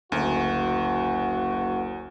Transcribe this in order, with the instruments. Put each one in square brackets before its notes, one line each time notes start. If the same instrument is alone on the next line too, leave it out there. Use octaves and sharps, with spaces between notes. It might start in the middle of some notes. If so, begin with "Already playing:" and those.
[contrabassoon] F#1 [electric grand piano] D2 [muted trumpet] F#4